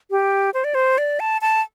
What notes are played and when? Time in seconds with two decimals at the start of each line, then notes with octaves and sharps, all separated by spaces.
0.11 G4
0.54 C5
0.64 D5
0.75 C5
0.98 D5
1.20 A5
1.41 A5